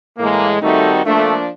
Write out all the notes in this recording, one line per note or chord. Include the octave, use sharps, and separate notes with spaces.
A2 E3 G#3 A#3
D#3 G3 A3 C4 D#4 F#4
F3 A3 A#3 D4